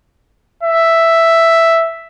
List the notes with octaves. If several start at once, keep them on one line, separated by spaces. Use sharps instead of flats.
E5